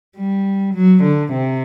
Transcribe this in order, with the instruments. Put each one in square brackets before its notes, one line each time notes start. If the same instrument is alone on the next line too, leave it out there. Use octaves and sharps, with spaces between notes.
[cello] G3
F#3
D3
C3